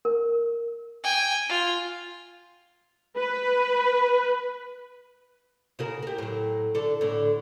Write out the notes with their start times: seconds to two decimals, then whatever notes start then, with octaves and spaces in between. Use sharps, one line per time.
0.05 A#4
1.04 G5 G#5
1.49 F4
3.17 B4
5.79 C#3 F#4 A#4
6.02 G4 A#4
6.18 A2 F#3
6.75 D3 A4
7.01 A2 D3